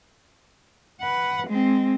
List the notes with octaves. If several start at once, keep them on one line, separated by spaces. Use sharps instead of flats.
B4 F#5
G#3 C4